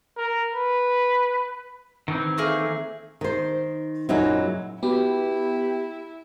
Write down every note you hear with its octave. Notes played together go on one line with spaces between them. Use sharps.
A#4
B4
D#3 E3 C4
A3 A#3 G#4
D#3 C5
F#2 A#2 C#3 F#3 D#4 E4
B3 E4 F#4 G4